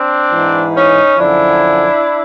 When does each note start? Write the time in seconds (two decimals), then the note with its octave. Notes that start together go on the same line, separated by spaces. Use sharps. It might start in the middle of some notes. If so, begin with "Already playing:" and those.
Already playing: C4 D4
0.31 G#2 E3
0.74 C#4 D#4
1.17 F#2 D3 F3 D4 E4